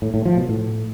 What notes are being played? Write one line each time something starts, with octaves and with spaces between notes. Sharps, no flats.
A2
A2
F3
B2
A2